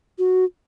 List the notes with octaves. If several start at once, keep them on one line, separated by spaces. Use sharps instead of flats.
F#4